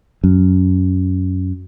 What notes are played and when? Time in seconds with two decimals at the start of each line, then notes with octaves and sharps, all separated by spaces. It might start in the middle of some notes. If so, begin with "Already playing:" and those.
0.24 F#2